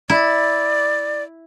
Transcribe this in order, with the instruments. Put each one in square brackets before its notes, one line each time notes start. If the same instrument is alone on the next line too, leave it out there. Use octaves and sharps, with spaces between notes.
[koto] E4 [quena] D5